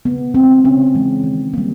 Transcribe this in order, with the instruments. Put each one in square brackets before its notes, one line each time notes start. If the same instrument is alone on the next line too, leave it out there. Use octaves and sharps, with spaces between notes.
[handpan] C#3 B3
E3 G#3 C4
C#3 C#4
E3 G#3
D#3
G3 A#3